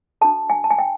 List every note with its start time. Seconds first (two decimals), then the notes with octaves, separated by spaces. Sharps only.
0.21 D4 F#4 A4 A5
0.50 G#5
0.64 A5
0.71 G#5
0.78 G5